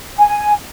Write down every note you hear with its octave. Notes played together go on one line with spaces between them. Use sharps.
G#5